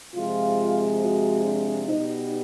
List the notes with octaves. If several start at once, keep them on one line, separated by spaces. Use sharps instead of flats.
C3 F3 G#3 F4
F#4
D4
B2 G3 B3 D#4